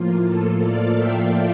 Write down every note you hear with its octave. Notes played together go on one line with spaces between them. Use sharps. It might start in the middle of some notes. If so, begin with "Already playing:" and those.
Already playing: A2 F3 A#3 F4
F4 A4
D5 F5
E5 G5